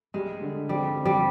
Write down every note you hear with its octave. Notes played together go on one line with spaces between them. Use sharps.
G3 G#3
D3
G3 C4
C4
G3